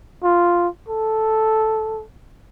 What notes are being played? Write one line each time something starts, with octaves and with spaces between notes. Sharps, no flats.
F4
A4